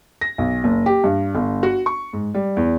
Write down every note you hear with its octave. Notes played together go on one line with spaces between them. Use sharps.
A#6
B1
F#1
G4
G2
G1
F#4
C#6
G#2
G3
E2